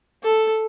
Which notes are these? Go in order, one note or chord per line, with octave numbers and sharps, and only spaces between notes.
A4